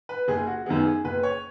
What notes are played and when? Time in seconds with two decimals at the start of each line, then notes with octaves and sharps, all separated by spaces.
0.09 B4
0.28 F#1 G#4
0.47 F#4
0.66 F#2 D#3 B3 G#4
0.86 G#4
1.05 F#1 B4
1.23 C#5